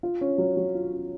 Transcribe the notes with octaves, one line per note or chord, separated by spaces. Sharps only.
F4
C#4
F#3
F#3
F4
C#4